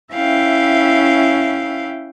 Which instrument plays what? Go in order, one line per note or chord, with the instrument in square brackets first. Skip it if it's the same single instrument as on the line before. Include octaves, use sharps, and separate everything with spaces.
[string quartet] C#4 E4 E5 F5 G5